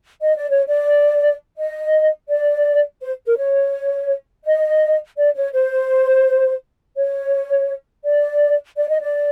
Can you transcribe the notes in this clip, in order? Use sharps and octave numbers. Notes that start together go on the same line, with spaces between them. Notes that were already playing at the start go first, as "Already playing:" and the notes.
D#5
D5
C#5
D5
D#5
D5
C5
A#4
C#5
D#5
D5
C#5
C5
C#5
D5
D5
D#5
D5